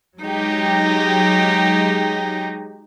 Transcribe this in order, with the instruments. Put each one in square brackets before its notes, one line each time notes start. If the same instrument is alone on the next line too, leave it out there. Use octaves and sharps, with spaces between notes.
[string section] F#3 G#3 D#4 G4